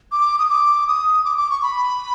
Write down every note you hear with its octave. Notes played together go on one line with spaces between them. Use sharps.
D6
D#6
D6
D#6
D6
D6
C#6
B5